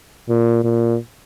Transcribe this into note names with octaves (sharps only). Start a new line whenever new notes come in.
A#2
A#2